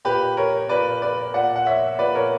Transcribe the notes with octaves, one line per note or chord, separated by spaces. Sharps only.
A#2 G4 B4
A#4 C#5
A#2 B4 D5
B4 D5
A#2 D5 F#5
F#5
C#5 E5
A#2 B4 D5
A#4 C#5